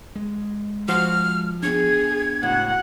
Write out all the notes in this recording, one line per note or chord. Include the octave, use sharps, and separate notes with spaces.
G#3
F3 F#4 C5 F6
B3 D4 G#4 G#6
C#2 A2 F#4 F#5